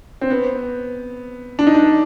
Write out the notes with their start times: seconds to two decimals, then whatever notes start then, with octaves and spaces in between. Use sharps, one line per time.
0.21 C4
0.30 B3
1.59 D4
1.67 D#4
1.74 D4